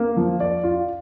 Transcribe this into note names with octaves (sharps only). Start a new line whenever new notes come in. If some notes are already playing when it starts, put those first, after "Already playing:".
Already playing: A#3
F3
D5
F4